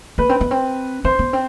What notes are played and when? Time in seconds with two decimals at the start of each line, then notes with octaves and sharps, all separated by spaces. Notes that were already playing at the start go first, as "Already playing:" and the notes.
0.18 A#3 B4
0.29 C4
0.41 B3
0.51 C4
1.04 C4 C5
1.19 B3
1.33 C4